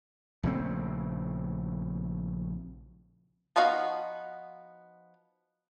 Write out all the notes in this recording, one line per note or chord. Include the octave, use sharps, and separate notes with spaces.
A#1 C#3 A3 C4
F3 B3 D#4 F#4 F5